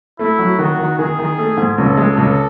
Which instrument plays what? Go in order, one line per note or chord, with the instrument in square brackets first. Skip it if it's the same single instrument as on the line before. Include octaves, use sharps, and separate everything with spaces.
[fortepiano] A3 [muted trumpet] E4
[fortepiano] F#3
[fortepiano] D#3 [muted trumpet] F#4
[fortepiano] D#3
[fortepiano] D#3 [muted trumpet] G#4
[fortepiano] D#3
A3
G#2
[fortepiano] C#2 [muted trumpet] A4
[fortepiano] G#3
[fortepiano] C#2 [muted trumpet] A4